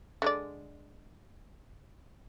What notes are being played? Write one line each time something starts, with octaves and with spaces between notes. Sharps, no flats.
D3 G#3 D5